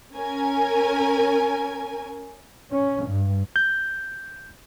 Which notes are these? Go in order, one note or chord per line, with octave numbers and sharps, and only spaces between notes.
C#4 A#4 G#5
C#4
G2
G6